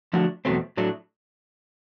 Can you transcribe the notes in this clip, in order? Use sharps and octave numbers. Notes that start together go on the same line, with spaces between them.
D3 F3 A3 D4 F#4
E2 B2 F#3 A3 C4
A2 F#3 A3 D4